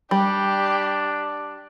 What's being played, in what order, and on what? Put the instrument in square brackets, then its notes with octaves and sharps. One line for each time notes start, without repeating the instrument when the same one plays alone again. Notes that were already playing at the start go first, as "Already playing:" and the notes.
[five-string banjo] G3 [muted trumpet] D4 [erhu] G4